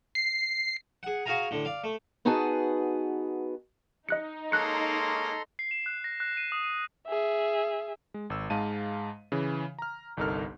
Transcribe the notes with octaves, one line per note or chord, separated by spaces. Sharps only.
C7
G#4 F#5
F#4 G#4 F5 G#5 A#5
A2 D3
D5 F5
A3
B3 D#4 F#4 G#4 B4 A5
D#4 D#5 F#6 C#7
G#3 A#3 C#4 A4 A#5 C6 F#6 C#7
C7
E7
F#6
A#6
F#6
D#7
D#6
D#7
G#4 E5
G#3
G#1 E6
G#2 G#3 F5 A5 D#7
C#3 E3
A#5 F6
G1 C2 D#4 A4 A#4 F6